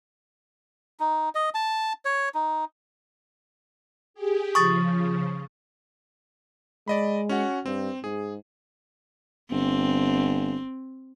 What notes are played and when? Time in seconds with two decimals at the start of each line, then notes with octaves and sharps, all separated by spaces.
1.00 D#4
1.35 D#5
1.55 A5
2.05 C#5
2.34 D#4
4.14 G4 G#4
4.55 C#3 F3 C#6 D#6 A6
6.88 G#3 D5 D#5 B5
7.29 C#4 F#4 F#5
7.66 G2 C4
8.04 G#2 G#4
9.51 G1 C4